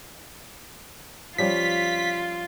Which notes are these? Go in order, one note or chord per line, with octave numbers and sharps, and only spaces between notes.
F3 G3 C#4 F4 B6